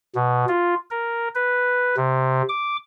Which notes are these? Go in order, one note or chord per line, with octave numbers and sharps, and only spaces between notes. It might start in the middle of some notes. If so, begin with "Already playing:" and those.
B2
F4
A#4
B4
C3
D6